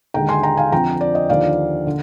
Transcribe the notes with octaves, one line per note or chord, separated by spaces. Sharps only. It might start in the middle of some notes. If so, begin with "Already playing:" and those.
D#2 D3 G#3 G5 A#5
G#5 C6
G5 A#5
F5 G#5
F2 D3 F3 C4 G5 A#5
D5
D#5
D#2 D3 F3 D5 F5
D3